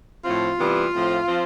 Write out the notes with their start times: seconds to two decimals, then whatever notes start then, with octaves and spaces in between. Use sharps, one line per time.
0.24 A2 F3 C4 F4
0.58 C3 E3 G3 B3
0.93 A2 F3 C4
1.27 F3 C4